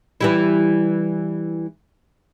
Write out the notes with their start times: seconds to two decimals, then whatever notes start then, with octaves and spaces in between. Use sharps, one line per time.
0.21 E3 G3 E4